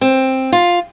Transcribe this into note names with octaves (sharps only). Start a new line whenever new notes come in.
C4
F4